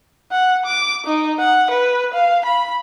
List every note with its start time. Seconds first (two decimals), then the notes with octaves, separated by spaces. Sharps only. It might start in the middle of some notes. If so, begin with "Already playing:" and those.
0.31 F#5
0.66 D6
1.07 D#4
1.39 F#5
1.71 B4
2.14 F5
2.46 B5